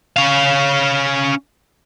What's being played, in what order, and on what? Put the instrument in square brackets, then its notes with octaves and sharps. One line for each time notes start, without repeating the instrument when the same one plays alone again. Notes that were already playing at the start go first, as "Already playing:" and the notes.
[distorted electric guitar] C#4 F5